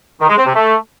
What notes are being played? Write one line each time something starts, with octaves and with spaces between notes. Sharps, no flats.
D#3
G#3
C4
C3
A3